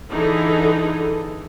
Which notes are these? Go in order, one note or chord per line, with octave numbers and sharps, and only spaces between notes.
D3 E3 D#4 G#4 A4